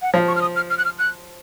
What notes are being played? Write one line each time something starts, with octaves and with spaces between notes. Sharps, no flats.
F#5
F3 F5
C#6
F6
D#6
F6
F6
F#6
F6
F#6